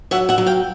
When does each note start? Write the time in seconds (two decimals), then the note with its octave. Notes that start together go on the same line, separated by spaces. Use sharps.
0.11 F#3 E5 F#5
0.29 E5 F#5
0.38 F#3
0.46 F5 G5